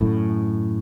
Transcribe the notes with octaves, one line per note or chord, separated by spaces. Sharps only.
F#2 A2